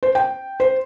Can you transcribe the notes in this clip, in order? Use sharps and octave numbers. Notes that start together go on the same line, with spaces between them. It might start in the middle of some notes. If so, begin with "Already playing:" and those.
C5
G5
C5